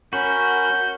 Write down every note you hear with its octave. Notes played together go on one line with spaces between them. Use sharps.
C#4 F#4 A#4 B5 G6